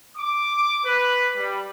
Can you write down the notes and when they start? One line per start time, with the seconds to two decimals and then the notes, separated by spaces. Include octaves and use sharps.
0.16 D6
0.84 B4
1.37 G3